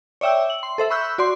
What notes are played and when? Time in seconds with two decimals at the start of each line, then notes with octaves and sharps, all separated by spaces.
0.21 C#5 D5 E5 G5 E6
0.50 F#7
0.63 C6
0.78 A4 C5 E5
0.90 B5 C#6 E6 F#6 G6
1.18 F#4 D5 C6